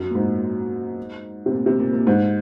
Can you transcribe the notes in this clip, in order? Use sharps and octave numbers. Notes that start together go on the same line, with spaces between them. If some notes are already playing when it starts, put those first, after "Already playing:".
Already playing: F#2
A#2
G#2
C3
A#2
C3
A#2
A#2
G#2